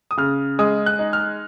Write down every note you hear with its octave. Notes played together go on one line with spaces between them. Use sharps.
D#6
C#3 F6
G#3 D#6
F#6
D#4
F6